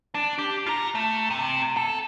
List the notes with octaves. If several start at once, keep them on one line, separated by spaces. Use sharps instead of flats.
D4
G4
F4 A#5
A3
C3
A4